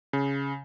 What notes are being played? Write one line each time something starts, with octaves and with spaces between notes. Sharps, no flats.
C#3